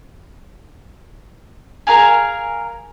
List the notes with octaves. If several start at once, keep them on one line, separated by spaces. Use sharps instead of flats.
G#4 A#4 F5 G#5